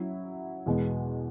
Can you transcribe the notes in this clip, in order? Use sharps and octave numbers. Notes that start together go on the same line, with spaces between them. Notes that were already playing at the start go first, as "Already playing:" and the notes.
Already playing: F#3 C#4 E4
E2 B2 G#3 B3